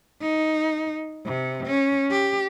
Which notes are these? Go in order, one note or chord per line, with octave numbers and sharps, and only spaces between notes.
D#4
C3
C#4
G4